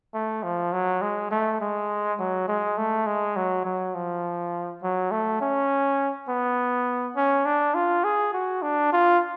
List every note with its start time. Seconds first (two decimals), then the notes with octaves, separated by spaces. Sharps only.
0.14 A3
0.43 F3
0.72 F#3
1.01 G#3
1.31 A3
1.61 G#3
2.19 F#3
2.48 G#3
2.77 A3
3.06 G#3
3.36 F#3
3.65 F#3
3.94 F3
4.83 F#3
5.11 A3
5.41 C#4
6.29 B3
7.16 C#4
7.45 D4
7.74 F4
8.04 G#4
8.33 F#4
8.62 D4
8.92 F4